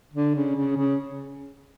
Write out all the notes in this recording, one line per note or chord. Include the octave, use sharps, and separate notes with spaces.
D3
C#3
C#3
C#3